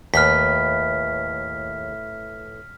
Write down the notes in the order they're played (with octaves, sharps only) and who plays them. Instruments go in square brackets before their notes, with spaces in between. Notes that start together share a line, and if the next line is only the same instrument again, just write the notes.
[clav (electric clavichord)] D#2 [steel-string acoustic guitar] A2 A3 B4 [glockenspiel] F6 B6